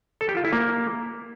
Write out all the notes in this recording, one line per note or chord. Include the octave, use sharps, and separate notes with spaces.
A4
G4
F4
E4
A#3